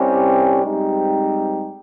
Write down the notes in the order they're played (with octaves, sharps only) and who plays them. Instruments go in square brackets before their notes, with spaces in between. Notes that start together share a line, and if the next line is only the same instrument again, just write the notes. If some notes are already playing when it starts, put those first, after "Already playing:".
Already playing: [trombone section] C2 C3 G3 C#4 G4
G#2 G3 C4 D#4 G4